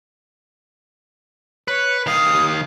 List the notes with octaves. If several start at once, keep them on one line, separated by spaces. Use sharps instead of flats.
B4 C#5
D#3 F5 D#6